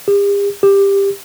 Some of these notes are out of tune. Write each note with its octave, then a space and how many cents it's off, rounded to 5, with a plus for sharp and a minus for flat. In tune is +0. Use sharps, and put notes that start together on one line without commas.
G4 +45
G4 +15